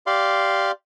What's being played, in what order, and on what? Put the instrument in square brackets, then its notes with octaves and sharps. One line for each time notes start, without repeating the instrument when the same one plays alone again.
[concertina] G4 D5 F5 C6